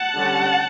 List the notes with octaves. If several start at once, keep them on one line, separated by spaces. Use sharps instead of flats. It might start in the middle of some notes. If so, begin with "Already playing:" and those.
Already playing: F#5 A5
D3 G3 C#4